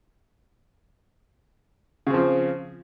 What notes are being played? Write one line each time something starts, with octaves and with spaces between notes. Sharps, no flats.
C#3 F3 C4